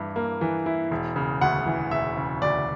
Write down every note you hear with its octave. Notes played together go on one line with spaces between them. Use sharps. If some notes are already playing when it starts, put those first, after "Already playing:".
Already playing: G2 E3 E4
A#3
E3
E4
E1
C#3
D2 F#5
E3
E1 E5
C#3
D2 D5